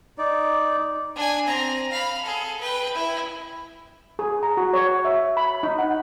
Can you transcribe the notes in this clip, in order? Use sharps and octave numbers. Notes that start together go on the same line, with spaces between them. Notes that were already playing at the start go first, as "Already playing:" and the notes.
D#4 D5
D4 G#5
C4 A#5
F5 B5
G#4 A4
B4 G5
E4
G#4
A#5
F#4
C#5
E5
B5
D#4
F#5